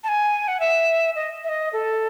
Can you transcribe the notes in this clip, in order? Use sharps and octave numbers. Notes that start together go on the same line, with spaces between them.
A5
G#5
F#5
E5
D#5
E5
D#5
A4